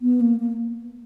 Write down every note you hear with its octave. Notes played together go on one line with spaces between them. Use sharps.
B3
A#3
A#3